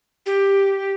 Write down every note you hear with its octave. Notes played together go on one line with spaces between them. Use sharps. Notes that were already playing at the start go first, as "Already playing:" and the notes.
G4